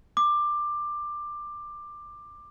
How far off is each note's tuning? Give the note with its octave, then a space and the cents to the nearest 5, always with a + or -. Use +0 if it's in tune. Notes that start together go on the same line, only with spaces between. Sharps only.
D6 +15